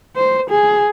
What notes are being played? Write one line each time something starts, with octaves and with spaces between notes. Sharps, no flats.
C5
G#4